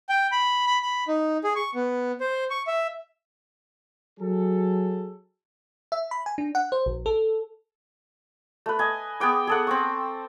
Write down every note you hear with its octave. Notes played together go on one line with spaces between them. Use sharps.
G5
B5
B5
B5
D#4
G#4
C#6
B3
C5
C#6
E5
F#3 G#4 A4
E5
B5
G#5
D4
F#5
C5
A#1
A4
A3 B4
D#5 G#5
B3 G#4 G5 D6
G#4 A4 F#5
C4 G5 C#6